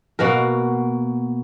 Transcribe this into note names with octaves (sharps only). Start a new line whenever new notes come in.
B2 A#3 F#4 A#4